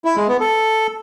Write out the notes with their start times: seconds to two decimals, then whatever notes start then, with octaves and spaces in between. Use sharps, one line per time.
0.05 E4
0.16 G#3
0.28 B3
0.40 A4